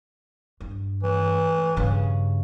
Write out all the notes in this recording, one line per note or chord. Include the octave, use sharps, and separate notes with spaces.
G2
E3
G2 C#3